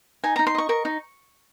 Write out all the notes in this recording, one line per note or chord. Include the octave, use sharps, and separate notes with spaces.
D#4 G#5
D#4 A#5
C6
D#5 C#6
A#4 C#6
D#4